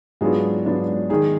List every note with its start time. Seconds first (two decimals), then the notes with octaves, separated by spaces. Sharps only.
0.21 G#2 F#3 B3 D4 F4 G#4
0.65 G#2 F#3 B3 D4 F4
1.10 D#3 G#3 D#4 G#4